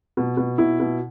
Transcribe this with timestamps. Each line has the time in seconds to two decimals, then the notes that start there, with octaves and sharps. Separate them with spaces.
0.17 B2
0.37 B2
0.58 B2 E4
0.80 B2